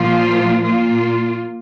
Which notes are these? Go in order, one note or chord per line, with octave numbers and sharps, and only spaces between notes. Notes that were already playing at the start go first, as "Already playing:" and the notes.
Already playing: A#2 F3 A#3 F4
A#2 A#3 F4